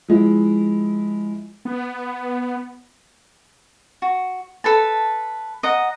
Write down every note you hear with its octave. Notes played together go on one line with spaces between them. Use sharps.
F3 G#3 E4
B3
F#4
A4 B4 A5
D#5 F#5 A#5